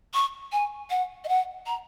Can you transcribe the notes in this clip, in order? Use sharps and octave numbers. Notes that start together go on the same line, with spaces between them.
C#6
G#5
F#5
D#5
F#5
A#5